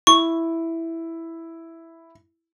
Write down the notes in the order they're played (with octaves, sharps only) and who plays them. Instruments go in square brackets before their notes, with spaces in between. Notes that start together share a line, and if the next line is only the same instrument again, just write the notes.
[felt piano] E4 [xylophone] C#6